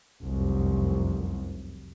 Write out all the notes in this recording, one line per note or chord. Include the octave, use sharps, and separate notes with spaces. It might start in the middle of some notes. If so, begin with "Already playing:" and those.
F1 C2 F#2